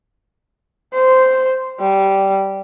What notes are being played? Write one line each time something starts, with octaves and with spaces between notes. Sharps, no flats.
C5
G3